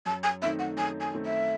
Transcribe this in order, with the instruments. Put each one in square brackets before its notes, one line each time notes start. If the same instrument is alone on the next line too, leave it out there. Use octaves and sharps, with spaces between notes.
[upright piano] F#2 [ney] A5
[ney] G#5
[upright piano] D#3 A3 C4 D#4 [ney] E5
[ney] F#5
[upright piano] F#2 [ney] G#5
[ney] G#5
[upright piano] D#3 A3 C4 D#4
[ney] E5